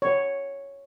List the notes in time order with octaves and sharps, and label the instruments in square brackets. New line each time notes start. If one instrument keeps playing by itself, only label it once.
[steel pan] C#5